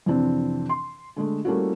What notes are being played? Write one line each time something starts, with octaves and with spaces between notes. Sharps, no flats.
F2 C3 E3 C4 D4
C6
D3 G#3 A3
G3 A3 A#3 C#4 E4 F#4